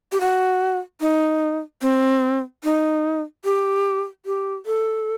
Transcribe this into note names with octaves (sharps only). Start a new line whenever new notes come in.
G4
F#4
D#4
C4
D#4
G4
G4
A4